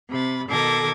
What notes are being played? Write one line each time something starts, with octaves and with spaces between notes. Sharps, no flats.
C3 B5 A6
B2 D#3 A4 D6 G#6 A#6